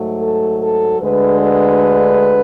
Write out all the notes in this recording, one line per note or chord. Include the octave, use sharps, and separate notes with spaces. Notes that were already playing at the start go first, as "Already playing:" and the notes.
Already playing: G#2 F#3 A3
A4
A4
D2 D3 G#3 B4
B4